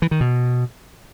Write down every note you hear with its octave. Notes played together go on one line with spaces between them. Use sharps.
E3
D#3
B2